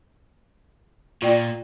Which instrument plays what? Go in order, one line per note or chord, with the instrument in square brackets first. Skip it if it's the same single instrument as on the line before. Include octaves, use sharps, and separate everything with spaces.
[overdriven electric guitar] A#2 [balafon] F4 D5 G5